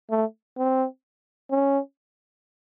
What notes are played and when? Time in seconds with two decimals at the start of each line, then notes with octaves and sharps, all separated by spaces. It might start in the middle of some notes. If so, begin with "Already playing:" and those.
0.11 A3
0.58 C4
1.51 C#4